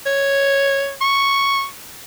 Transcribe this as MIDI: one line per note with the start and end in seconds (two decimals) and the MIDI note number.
0.06 0.93 73
1.01 1.66 85